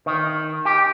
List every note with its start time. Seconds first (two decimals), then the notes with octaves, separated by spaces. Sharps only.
0.06 D#3
0.65 G4